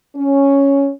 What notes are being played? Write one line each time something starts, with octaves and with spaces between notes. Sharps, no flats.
C#4